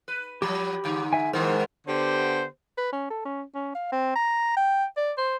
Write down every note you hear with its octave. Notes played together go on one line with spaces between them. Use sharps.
B4
F3 F#3 G4 B5
G#2 D3
E5 G#5
G#2 D#3 G#3 B3 A#4 C5
D3 B3 G4 C5
B4
C#4
A4
C#4
C#4
F5
C4
A#5
G5
D5
C5